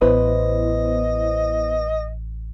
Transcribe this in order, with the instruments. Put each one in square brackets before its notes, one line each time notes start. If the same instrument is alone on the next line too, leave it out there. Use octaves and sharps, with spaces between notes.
[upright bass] A1 [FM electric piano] B3 E4 C5 [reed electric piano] B4 [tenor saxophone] D#5